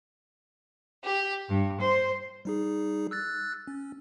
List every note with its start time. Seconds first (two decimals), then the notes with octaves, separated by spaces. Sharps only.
1.04 G4
1.48 G2
1.81 C5
2.45 G3 D#4 G#4
3.11 E6 F#6 A6
3.67 C#4